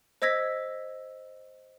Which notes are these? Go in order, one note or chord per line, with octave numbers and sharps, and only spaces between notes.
C5 D#5 E6 G#6 A#6 B6